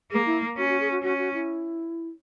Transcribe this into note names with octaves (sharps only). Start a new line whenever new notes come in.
A#3 G#4
E4
C#4 F#4
F#4
G#4
F#4
C#4 F#4
F#4
E4